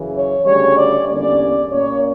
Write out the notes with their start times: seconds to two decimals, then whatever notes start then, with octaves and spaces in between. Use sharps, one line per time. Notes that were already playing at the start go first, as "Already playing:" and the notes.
Already playing: F#2 C#3 E3
0.16 C#5
0.46 D2 C#3 G3 C#5
0.77 D5
1.08 E2 D3 G3 A#3 C#4 D5
1.71 A#2 A#3 C#4 C#5